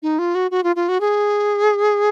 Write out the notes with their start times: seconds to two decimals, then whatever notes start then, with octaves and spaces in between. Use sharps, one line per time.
0.03 D#4
0.19 F4
0.35 F#4
0.51 F#4
0.64 F4
0.76 F4
0.89 F#4
1.00 G#4